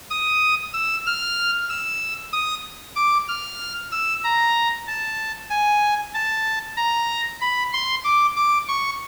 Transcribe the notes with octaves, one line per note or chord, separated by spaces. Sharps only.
D#6
E6
F6
E6
D#6
D6
F6
E6
A#5
A5
G#5
A5
A#5
B5
C6
D6
D6
C#6